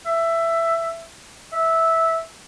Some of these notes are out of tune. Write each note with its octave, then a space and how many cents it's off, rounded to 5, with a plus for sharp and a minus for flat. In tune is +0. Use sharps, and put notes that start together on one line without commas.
E5 +10
E5 -10